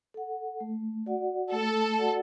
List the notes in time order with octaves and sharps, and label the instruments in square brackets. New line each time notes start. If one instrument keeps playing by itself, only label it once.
[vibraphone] A4 F#5
A3
F#4 D5 F#5
[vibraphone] A3 [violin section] A4
[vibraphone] F#4 D5 F#5